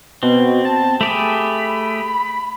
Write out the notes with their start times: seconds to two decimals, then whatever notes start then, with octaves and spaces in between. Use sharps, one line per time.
0.23 B2 C4
0.65 A5
1.01 A3 G4 G#4 B5